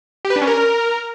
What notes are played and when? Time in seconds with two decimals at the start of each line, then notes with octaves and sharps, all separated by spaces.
0.25 G4
0.30 B4
0.36 D4
0.42 C#4
0.47 A#4